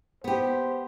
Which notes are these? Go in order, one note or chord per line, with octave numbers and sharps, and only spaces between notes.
B3 G4 C5